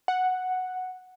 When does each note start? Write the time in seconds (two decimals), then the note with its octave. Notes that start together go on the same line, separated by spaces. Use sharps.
0.08 F#5